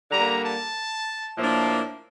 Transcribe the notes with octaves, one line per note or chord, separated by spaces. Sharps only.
D3 G3 A#3 A#5
A5
A2 F3 A#3 D4